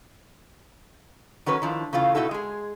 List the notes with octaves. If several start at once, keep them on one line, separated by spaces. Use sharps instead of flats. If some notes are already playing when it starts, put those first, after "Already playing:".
D#3 F#3 C#4 B4 C#5
D#3 F3 D4 E4
C#3 E3 A3 F4
B2 A3 D#4 E4 F#4 A4
G#3 G#4